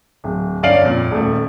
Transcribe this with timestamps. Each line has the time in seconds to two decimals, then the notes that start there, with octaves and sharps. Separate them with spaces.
0.24 D1
0.63 G1 C#4 D5 F5 D7 F#7
0.82 F2 A#2
1.11 D#1 A3